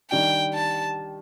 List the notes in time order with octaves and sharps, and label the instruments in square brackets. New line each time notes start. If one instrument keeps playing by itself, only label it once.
[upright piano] D#3 G3 D4 G4 [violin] G5
[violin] A5